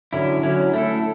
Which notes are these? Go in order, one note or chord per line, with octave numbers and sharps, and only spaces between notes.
D3 F#3 C#4 E4
D3 F#3 C#4 E4
A3 E4 A4